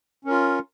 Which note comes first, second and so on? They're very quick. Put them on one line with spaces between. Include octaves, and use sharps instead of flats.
C#4 A#4 F4